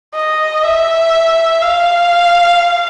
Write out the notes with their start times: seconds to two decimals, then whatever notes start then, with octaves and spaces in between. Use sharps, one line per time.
0.14 D#5
0.64 E5
1.62 F5